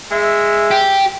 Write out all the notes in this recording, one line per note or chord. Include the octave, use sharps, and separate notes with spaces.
G#3 G#4 E5
G4